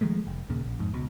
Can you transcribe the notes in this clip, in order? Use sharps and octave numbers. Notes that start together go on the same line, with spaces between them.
D#3 F3 G#3 A3
F1
D#2 A#2 C#3
A#1
F2 G#2
C#2 B2